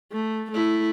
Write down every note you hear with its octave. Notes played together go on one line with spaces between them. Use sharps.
A3
A3 E4